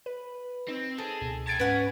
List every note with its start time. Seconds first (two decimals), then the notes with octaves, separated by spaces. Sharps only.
0.06 B4
0.68 C4 D#4
0.98 G#4 A4
1.22 C#2 B2
1.47 G5 A5 G#6 A6 D7
1.60 G#2 C#4 B4 F#5 G#5